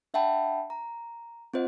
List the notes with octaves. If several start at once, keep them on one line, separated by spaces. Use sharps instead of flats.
D4 E5 F#5 G5 A5 B5
A#5
C4 F4 C5 D#5 F#5